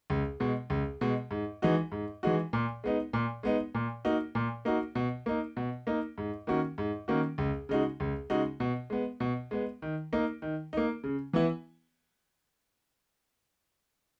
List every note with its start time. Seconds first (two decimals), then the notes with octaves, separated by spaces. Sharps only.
0.10 C#2
0.40 B2 G#3
0.70 C#2
1.01 B2 G#3
1.31 G#2
1.62 E3 G#3 D#4 F#4
1.92 G#2
2.23 E3 G#3 D#4 F#4
2.53 A#2
2.84 G#3 B3 D#4
3.13 A#2
3.43 G#3 B3 D#4
3.75 A#2
4.05 A#3 D#4 F#4
4.35 A#2
4.65 A#3 D#4 F#4
4.95 B2
5.26 A#3 D#4
5.57 B2
5.87 A#3 D#4
6.18 G#2
6.47 D#3 A#3 C#4 F#4
6.78 G#2
7.08 D#3 A#3 C#4 F#4
7.38 C#2
7.69 C#3 G#3 D#4 F#4
8.00 C#2
8.30 C#3 G#3 D#4 F#4
8.60 B2
8.90 G#3 B3
9.20 B2
9.51 G#3 B3
9.82 D#3
10.13 A#3 D#4
10.42 D#3
10.73 A#3 D#4
11.04 C#3
11.33 E3 B3 E4